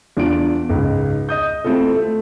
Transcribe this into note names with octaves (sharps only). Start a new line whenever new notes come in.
E2 D4 F4 D7
C#2 G#2
D#5 D#6 G6
A3 C4 E4 F4 A4
A3